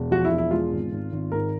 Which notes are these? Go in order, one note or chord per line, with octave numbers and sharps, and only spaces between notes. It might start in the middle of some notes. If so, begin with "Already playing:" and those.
Already playing: E1
F3 F#4
E4
E1
E4
G#3 F4
G#1
G#1
G#1
G#2 A#4